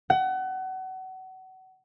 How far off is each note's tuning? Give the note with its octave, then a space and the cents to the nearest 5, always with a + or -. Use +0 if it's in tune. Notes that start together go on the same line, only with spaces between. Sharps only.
F#5 +30